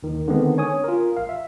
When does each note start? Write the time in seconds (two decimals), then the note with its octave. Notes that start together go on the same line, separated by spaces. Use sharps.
0.03 D#2 D#3
0.28 D3 D#3 G#3 B3 C4
0.58 C#5 G#5 D#6
0.84 F4 A#4
1.17 A1 F5
1.29 E5